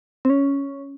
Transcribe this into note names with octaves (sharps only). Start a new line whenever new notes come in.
C4
C#4